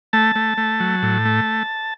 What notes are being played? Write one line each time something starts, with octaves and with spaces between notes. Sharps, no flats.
A3 A5
A3
A3
F#3
A2
A3